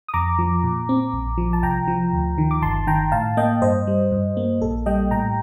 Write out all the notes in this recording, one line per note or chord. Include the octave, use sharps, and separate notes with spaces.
D#6
F2 A#5 D6
F3
A#2
C4
A#1
F3
A5
C2 G5 A#5
F3
D2
D#3
D6
G1 A5 C6
D#3 G5 A#5
A2 F5 A5
A#3 D#5 G5
G2 C5 D#5
G3
G2
A#3
A#1 A4
G3 D#5 G5
A2 G5 A#5